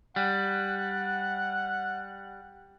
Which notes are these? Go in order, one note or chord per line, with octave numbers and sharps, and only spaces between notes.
G3 F#5